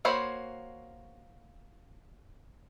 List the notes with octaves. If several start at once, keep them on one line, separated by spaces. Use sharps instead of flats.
A#3 F#4 C5 C#5 B5